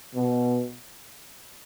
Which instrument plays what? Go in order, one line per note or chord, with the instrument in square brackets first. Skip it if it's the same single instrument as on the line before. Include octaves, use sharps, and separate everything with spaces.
[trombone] B2